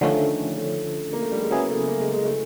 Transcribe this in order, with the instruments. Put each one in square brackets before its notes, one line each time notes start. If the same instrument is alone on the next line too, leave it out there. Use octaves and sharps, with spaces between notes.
[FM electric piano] D3 F3 A3 C#4 [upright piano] D#3
[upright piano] D#3
A3
A#3
A3
G3
G#3
[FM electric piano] C#3 F#3 B3 E4 G#4 [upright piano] A#3
[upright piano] A3
A#3
G#3
G#3
A3